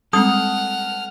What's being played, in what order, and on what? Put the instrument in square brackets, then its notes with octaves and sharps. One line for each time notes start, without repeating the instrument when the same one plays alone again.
[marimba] G3 G#3 C4 [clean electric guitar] A4 [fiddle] F#5 F6 [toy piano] D#6